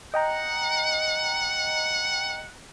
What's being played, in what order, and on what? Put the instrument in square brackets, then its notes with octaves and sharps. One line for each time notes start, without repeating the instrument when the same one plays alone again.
[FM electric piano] D#5 G5 A#5 [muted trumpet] F#5